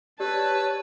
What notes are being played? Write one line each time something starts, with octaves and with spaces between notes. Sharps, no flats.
G4 B4 C#5 D5 A5 E6